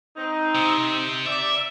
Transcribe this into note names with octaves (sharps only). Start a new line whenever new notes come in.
C4 D#4
C3
D5 E5